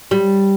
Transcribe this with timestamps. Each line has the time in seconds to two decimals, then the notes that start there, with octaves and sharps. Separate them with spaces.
0.11 G3